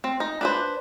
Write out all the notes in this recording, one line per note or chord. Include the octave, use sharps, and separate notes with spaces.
C4
D#4
D4 B4 C5